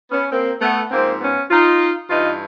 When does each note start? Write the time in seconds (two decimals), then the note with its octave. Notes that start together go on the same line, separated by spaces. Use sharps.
0.11 B3 C#4
0.31 A#3 C4
0.61 A3 B3
0.91 G#2 F3 A#3 C4
1.20 B3 C#4
1.50 D#4 F4
2.09 G2 E3 D#4 F4